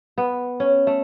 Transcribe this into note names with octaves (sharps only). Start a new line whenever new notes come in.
B3
C#4
A3